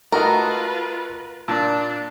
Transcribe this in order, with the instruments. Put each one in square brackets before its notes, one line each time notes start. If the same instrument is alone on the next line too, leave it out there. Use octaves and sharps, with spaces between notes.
[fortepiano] A3 F#4 D#5 [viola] F4 B4 [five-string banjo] A#4
[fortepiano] A#2 A5 E6 [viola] D4